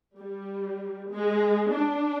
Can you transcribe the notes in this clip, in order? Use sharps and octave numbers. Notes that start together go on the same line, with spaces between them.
G3
G#3
D4